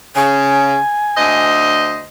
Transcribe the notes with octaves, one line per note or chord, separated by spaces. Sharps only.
C#3 G#5
D2 C5 D#5